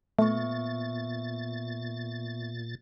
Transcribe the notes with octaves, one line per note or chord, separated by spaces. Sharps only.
A#2 A3 B3 E5 C#6 A6